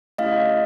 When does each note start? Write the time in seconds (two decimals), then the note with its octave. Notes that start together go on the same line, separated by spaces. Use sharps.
0.18 A3 C#4 E4 G4 D#5 F5